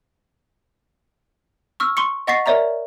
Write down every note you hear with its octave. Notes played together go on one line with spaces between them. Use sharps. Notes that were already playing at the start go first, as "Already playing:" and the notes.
C#6 E6 F6
C6 C#6 C#7
D#5 F#5 C#6 A6 B6 C7
A#4 C#5 D5 E5 A#5